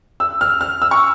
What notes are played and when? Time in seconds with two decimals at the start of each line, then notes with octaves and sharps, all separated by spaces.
0.20 E6
0.41 F6
0.61 F6
0.82 E6
0.91 C#6